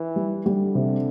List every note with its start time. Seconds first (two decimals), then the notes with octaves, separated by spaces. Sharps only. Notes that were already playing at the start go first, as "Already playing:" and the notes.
Already playing: E3
0.16 G3
0.46 D3 G3
0.75 C3